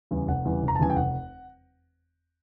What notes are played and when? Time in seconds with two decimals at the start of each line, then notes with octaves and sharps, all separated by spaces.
0.11 E2 C#3 E3 G3
0.28 F1 F#5
0.45 E2 C#3 E3 G3
0.62 F1
0.68 A#5
0.75 A5
0.79 E2 C#3 E3 G3 G#5
0.90 G5
0.96 F1 F#5